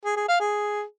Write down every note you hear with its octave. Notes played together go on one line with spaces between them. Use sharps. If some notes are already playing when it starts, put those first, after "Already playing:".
G#4
G#4
F5
G#4